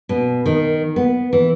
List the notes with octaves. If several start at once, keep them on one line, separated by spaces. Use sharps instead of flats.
B2
D#3
B3
E3